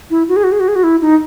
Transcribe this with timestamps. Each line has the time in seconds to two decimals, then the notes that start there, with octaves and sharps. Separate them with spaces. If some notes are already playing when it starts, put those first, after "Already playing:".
0.10 E4
0.29 F#4
0.36 G#4
0.44 F#4
0.52 G#4
0.60 F#4
0.68 G#4
0.75 F#4
0.83 E4
1.01 D#4